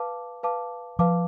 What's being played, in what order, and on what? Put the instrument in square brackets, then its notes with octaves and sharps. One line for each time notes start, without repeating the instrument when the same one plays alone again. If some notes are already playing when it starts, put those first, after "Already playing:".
Already playing: [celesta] B4 F5 A5 D6
B4 F5 A5 D6
[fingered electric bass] F3 [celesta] B4 F5 A5 D6